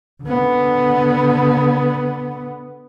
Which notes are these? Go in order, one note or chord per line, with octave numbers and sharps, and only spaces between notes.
D3 B3